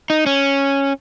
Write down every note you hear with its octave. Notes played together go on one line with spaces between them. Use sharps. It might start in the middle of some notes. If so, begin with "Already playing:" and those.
D#4
C#4